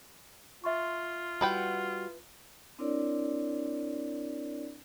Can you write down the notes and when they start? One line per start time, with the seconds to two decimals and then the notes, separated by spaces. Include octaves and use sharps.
0.64 F4 E5 C6 C#6
1.41 G3 E4 F#4 B4 F#5 G5
2.79 C4 D4 E4 A#4 C#5 D5